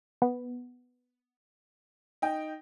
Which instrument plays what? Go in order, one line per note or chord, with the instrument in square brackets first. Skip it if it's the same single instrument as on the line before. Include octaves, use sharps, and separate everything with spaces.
[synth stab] B3
[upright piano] D#4 G5